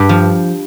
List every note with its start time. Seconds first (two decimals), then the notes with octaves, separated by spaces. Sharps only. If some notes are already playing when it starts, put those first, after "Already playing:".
Already playing: G2 G4
0.09 F3